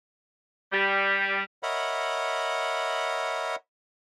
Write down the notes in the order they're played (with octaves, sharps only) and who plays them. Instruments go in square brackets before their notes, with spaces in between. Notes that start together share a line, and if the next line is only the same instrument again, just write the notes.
[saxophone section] G3
[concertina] A#4 C#5 D#5 E5 F#5 B5